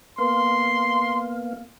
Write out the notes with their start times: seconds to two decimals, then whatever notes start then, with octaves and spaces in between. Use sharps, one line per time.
0.18 A#3 B3 F5 C6